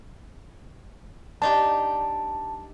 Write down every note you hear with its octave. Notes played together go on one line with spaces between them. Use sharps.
D4 D#4 G4 A5